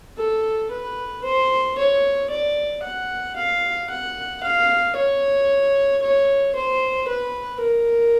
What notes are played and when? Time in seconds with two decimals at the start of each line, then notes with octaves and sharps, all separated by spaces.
0.18 A4
0.71 B4
1.24 C5
1.78 C#5
2.30 D5
2.83 F#5
3.36 F5
3.90 F#5
4.43 F5
4.96 C#5
6.02 C#5
6.55 C5
7.08 B4
7.61 A#4